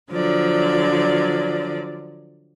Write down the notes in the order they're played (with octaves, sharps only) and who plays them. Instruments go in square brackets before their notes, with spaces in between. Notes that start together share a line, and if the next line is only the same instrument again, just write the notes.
[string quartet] D3 F3 F#3 D5